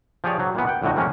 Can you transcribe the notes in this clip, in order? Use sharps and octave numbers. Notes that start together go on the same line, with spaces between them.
F3 G4 G#4 C#5 D5
F#3
A#2 E3 B3
F#5 G5
F2 A2 D3 F#4 D#5
D#3 F3 G#3 A#3 C#4